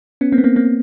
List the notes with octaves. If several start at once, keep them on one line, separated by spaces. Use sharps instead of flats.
B3 C#4
A#3 C4
B3
A#3 C4
A#3 C4